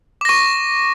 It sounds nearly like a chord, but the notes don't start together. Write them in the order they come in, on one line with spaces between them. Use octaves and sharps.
D6 A#6 C#6